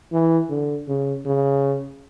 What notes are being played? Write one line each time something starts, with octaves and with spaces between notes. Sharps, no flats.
E3
D3
C#3
C#3